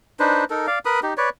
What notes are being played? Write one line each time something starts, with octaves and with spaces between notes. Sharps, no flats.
D4 D#4 B4 C5
D#4 A4 A#4
D5 F5
A#4 B4 B5 D#6
D#4 G4
B4 C#5 D5